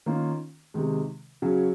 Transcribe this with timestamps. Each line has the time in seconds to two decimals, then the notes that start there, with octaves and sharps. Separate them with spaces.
0.06 D#3 A#3 C#4 F4
0.74 C3 D#3 G#3
1.42 C#3 F#3 C#4